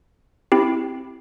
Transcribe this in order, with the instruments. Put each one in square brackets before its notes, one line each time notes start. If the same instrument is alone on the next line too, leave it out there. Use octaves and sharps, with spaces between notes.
[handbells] C4 E4 G4